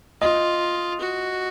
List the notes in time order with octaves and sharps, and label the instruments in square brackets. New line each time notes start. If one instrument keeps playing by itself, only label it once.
[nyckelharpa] F4 [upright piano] D#5
[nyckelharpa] F#4